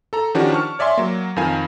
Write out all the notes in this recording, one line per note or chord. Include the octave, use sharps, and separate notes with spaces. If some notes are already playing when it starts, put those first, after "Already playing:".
A4 A#5
D#3 F3 C#4 D4 F#4 G4
A5 C#6 F6
C#5 D5 E5 G#5 C6
F#3 A#3
F2 D#3 A#4 F5 G#5